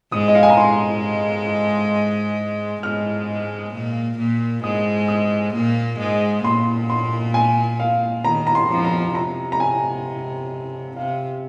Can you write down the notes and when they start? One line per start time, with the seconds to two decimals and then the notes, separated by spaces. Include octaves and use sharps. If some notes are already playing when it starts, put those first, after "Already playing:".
0.12 G#2 G#3 D#6
0.28 D#5
0.35 F5
0.43 G#5
0.50 A#5
0.57 G#2 G#3 C6
2.83 G#2 G#3 F6
3.73 A#2 A#3
4.18 A#2 A#3
4.63 G#2 G#3 D#6
5.08 D#6
5.53 A#2 A#3
5.99 G#2 G#3
6.44 A#2 A#3 C6
6.90 C6
7.34 G#5
7.80 F5
8.24 D#3 A#5
8.47 A#5
8.55 C6
8.70 F2 F3
8.85 A#5
9.15 C3 A#5
9.52 A#5
9.60 G#5
10.96 C3 F5